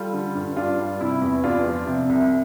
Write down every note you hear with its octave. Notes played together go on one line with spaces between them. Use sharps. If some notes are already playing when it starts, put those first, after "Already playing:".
Already playing: G3 F4 A4
D3
G2
G2 D4 F4
G3
C3 E4
E2
E2 D4 F4
F3
C3
C2